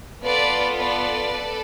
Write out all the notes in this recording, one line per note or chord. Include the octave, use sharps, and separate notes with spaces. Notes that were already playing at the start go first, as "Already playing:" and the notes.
B3 F4 A4 B4 D5
B4 D5
A4